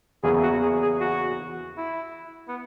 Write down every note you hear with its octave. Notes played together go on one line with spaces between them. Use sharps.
E2 C#3 F#3 A#3 E4 G#4
F#4
G#4
G#4
F#4
E4
B3